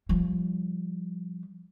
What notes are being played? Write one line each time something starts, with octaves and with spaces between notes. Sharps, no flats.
F3 G3